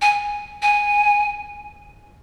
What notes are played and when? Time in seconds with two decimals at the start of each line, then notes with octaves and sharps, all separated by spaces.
0.02 G#5
0.62 G#5